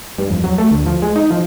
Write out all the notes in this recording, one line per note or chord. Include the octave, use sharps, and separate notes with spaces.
G2
F2
F#3
A3
D2
F3
G#3
D#4
F3